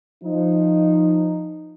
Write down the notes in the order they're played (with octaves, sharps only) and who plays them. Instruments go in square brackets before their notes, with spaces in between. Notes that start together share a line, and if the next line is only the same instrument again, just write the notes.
[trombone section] F3 D#4